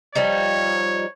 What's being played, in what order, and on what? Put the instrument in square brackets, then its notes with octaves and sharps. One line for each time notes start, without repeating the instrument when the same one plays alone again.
[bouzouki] F3 G3 D#4 [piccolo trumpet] C#5